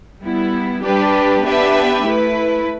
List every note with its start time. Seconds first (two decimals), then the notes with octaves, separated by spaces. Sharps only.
0.22 G3 B3 E4
0.82 G3 D4 G4 B4
1.44 B3 D4 G4 B4 E5
2.05 A3 E4 B4